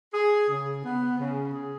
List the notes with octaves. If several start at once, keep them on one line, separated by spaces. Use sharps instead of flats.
G#4
C#3
B3
C#3
G#4